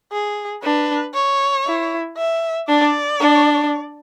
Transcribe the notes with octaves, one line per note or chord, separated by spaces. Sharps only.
G#4
D4 B4
C#5
E4
E5
D4 D5
D4